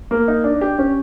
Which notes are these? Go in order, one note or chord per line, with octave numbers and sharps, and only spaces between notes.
A#3
D#4
D4
G4
C#4